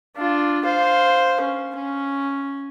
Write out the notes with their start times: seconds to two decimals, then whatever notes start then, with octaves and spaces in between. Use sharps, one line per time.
0.16 D4 F4
0.65 C5 F5
1.41 C#4
1.75 C#4